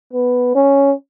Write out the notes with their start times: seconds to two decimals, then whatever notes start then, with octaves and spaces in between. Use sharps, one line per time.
0.13 B3
0.55 C#4